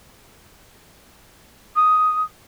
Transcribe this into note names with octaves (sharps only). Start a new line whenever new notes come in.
D#6